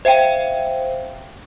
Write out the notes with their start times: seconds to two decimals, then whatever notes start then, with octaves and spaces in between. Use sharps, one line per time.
0.05 C5 E5 F5 G5